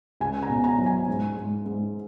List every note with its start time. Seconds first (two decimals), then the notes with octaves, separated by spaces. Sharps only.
0.20 C#2 G#5
0.43 A#5
0.49 B2
0.64 A#5
0.78 F#3
0.86 G#5
1.08 G#2
1.37 G#2
1.66 G#2